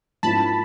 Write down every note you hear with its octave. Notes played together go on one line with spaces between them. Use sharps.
G#2 F3 A#3 C#4 E4 A5 B5